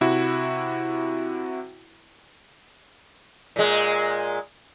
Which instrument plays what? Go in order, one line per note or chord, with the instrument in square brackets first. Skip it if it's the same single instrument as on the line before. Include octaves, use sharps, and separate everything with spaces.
[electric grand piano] C3 E4 F#4
[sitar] A#2 G#3